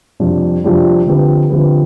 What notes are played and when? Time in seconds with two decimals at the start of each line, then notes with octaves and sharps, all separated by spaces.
0.20 F2 C3 G3 D4 F4
0.64 F2 C3 G3 D4 F4
1.07 D3 F3 C4 G4 B4
1.50 D3 F3 C4 G4 B4